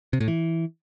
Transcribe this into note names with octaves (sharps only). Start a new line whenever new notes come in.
C3
A2
E3